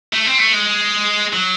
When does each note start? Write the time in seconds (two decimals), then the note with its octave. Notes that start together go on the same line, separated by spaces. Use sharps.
0.13 A3
0.26 C4
0.39 A3
0.53 G#3
1.33 F#3